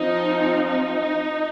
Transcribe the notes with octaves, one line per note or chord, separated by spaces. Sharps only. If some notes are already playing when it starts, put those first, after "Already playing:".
Already playing: F3 C4 D#4
D#4